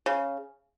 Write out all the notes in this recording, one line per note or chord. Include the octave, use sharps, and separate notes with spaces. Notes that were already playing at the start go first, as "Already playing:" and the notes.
C#3